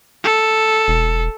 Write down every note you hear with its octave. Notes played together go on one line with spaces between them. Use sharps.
A4
E1